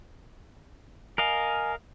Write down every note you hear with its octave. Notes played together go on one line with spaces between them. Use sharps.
A#4 D#5 F5 G#5